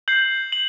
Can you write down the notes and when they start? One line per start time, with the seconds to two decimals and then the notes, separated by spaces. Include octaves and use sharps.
0.08 G6 C7 F#7
0.52 F#7